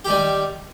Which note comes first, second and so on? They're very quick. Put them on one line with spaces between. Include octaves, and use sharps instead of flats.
G4 D#3 G3